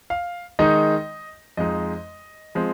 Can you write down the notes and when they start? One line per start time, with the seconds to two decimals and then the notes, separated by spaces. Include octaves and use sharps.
0.10 F5
0.59 D#3 G#3 D#4 D#5
1.57 F2 F3 G#3 D#4 D#5
2.55 F3 G#3 C4